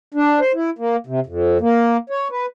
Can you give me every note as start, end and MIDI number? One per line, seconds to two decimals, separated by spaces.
0.14 0.40 62
0.40 0.52 72
0.54 0.70 64
0.78 0.96 58
1.07 1.20 48
1.26 1.58 41
1.61 1.97 58
2.10 2.28 73
2.31 2.46 71